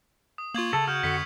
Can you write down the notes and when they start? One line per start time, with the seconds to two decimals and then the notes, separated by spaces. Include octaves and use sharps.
0.38 D#6
0.54 A#3 F4 C#6 G#6 F#7
0.73 C#3 A4
0.88 F#4 F6 G6
1.03 F2 D3 B6 C#7